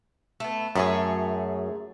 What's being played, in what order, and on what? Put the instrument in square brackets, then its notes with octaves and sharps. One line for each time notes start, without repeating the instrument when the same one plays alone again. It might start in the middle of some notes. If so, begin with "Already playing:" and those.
[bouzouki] A3 B3
[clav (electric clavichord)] F#2 [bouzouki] A3 G#4 C#5